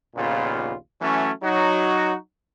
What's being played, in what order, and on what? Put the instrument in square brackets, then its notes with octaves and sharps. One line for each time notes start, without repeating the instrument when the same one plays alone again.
[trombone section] A#1 D#2 A#2 C#3 B3 F4
E3 F#3 A3 C#4
F#3 D#4 F#4